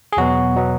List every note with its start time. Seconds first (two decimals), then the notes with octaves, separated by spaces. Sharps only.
0.13 G#4
0.17 E2 B2 F#3 B3 F#4
0.56 B2 F#3 B3